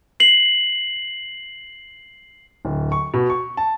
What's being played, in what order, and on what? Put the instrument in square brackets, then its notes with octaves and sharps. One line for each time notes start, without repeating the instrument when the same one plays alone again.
[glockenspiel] C7 F#7
[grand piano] D1
C#6
B2
C#6
A5